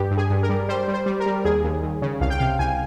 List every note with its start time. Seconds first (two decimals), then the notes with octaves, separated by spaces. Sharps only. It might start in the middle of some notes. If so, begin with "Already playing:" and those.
Already playing: G2 G4
0.11 G2
0.17 G#4
0.30 G2
0.43 A#4
0.49 G3
0.69 G3 C5
0.88 G3
0.93 C5
1.06 G3
1.20 A#4
1.26 G3
1.45 D#2 G#4
1.64 D#2
1.83 D#2
2.02 C#3
2.21 C2 F5
2.30 G5
2.39 C3 F5
2.59 C2 G#5